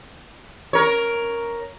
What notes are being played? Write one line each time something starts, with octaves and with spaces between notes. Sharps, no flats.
A#4 C#5